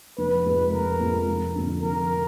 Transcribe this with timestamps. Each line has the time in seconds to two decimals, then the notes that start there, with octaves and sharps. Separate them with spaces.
0.18 F1 B4
0.45 F2 F3 G#3
0.73 F1 A#4
1.00 F2 F3 G#3
1.28 F1
1.55 F2 D3
1.82 F1 A#4